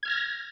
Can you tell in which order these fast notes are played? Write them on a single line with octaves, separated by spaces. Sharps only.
G#6 F6 A#6